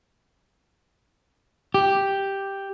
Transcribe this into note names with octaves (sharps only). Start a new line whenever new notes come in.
G4